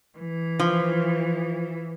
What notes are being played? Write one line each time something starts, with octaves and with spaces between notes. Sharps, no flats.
E3
F3